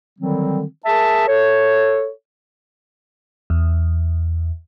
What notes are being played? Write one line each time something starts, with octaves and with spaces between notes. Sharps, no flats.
D3 D#3 F#3 G3 C4
G#4 A#4 E5 A5
A4 C#5
E2